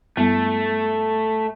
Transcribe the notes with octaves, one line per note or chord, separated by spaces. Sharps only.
G2 G3 A3 B3